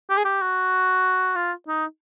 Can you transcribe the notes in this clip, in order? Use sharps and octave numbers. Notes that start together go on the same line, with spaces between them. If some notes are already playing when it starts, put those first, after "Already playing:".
G4
G#4
G4
F#4
F4
D#4